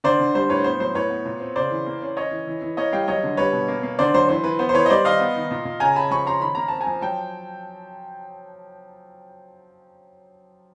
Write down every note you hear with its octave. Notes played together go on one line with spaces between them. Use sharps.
D3 C5 D5
D3
G3 C5
A2 B4 C#5
B3 C5
F#3 C5
A2 B4 C#5
B3
A#2
C4
C#3 C5 D5
E3
A#3
C#4
C#4 C#5 D#5
E3
E3
E3
A#3 C#5 D#5
G3 F5 G5
F#3 C#5 D#5
D3
G3 B4 C#5
B2
A#3
A#3
D3 C5 D5
F#3 C5
E3 C5
E3 B4
B3 C5
C5
E3 B4 C#5
D#5
G3 C5 D5
D#3 D#5 F5
B3
D#3
A#2
A#2
C#3 G#5 A#5
C#3 A5 B5
F3 B5 C#6
C#4 A#5 C6
D#3 B5
A#3 A#5
C4 A5
G#5 A#5
F3
F#3 G5 A5